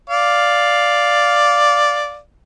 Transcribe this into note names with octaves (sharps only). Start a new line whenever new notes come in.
D5 F5